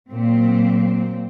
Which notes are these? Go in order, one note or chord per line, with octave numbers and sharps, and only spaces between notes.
A#2 F#3 C4